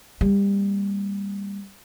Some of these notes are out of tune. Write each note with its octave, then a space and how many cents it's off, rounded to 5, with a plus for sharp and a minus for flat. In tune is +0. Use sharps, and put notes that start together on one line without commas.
G3 +25 A#3 +0